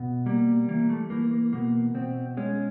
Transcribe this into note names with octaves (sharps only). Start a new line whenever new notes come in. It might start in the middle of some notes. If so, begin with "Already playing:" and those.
Already playing: B2
G3 A#3
E3 A#3
A3
E3 A#3
A#3
B2 A#3
B2 C4
G#3 C#4